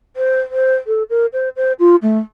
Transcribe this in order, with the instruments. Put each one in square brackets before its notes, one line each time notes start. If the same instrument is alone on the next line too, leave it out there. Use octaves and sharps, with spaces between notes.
[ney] C5
C5
A4
A#4
C5
C5
F4
A3